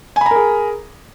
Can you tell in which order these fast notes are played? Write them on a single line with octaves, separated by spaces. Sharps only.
G#5 B5 A#5 A#4 G#4